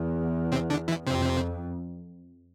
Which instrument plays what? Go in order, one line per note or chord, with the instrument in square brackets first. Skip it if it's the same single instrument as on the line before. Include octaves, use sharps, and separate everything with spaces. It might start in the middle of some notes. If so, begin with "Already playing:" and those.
Already playing: [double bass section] E2
[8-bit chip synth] C3 C4
D3 D4
E3 E4
[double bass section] F2 [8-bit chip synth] C3 C4